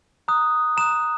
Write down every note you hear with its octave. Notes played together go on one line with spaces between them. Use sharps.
A#5 D#6 F#6
A#5 D#6 F#6 E7